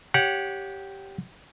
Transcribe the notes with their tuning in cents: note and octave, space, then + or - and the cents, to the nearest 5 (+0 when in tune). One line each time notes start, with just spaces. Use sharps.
G4 -5 C#5 +0 F#5 -15